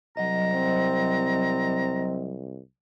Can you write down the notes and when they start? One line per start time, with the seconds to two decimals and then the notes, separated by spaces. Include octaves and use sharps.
0.17 C2 F#3 D#5 A#5
0.54 C4